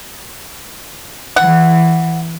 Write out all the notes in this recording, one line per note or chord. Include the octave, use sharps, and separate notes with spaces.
E3 F#5